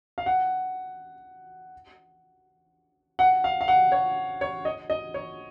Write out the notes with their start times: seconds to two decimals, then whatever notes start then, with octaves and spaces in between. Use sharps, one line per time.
0.18 F5
0.26 F#5
3.19 F#5
3.44 F5
3.61 F5
3.68 F#5
3.92 C#5
4.41 C#5
4.65 D#5
4.90 D#5
5.14 C#5